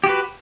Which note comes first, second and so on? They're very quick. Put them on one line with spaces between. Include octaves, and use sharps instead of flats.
G4 F#4 B4